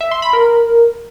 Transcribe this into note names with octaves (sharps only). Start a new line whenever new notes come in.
E5
C6
B5
A#4